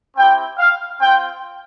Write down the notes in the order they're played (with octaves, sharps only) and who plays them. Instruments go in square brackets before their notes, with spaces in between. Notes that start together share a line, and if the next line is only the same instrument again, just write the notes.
[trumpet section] C4 E4 G4 G5
F5
C4 F4 G5